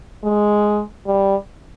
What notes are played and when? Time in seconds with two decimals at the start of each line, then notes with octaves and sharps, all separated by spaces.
0.24 G#3
1.06 G3